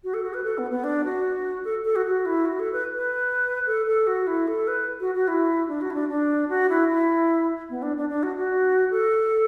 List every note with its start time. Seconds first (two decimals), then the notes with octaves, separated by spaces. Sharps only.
0.04 F#4
0.14 A4
0.23 F#4
0.34 B4
0.44 A4
0.58 B3
0.71 B3
0.84 D4
1.04 F#4
1.65 A4
1.85 A4
1.96 F#4
2.06 F#4
2.26 E4
2.45 F#4
2.59 A4
2.73 B4
2.95 B4
3.66 A4
3.86 A4
4.07 F#4
4.27 E4
4.48 A4
4.68 B4
5.00 F#4
5.15 F#4
5.28 E4
5.68 D4
5.81 F#4
5.90 E4
5.94 D4
6.09 D4
6.49 F#4
6.69 E4
6.88 E4
7.70 B3
7.82 D4
7.97 D4
8.09 D4
8.23 F#4
8.36 F#4
8.91 A4